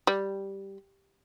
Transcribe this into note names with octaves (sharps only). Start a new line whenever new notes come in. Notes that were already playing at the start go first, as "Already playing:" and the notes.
G3